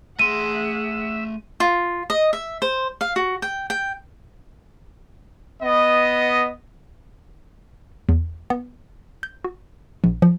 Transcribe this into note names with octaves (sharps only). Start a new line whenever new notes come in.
A3 G#4 E5 F#5 C6 D#7
F4
D#5
E5
C5
F5
F#4
G5
G5
B3 D#5
E2
B3
G6
F#4
A#1
F3